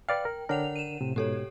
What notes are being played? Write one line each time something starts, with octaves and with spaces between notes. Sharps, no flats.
B4 D5 F5 G5
A#4
D3 D4 A#4 C#5 F#5 F7
D#7 E7
A2 C3
G#2 B2 G4 A4 C#5